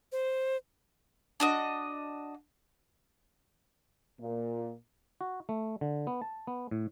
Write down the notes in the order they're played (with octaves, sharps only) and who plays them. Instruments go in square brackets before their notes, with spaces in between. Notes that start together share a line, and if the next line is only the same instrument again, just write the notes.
[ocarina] C5
[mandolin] D4 F#4 D#5
[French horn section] A#2
[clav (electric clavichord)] F#4
A3
D3
B3
A5
B3
A2